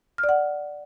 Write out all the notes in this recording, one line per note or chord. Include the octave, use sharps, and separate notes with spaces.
F6
D5
F#5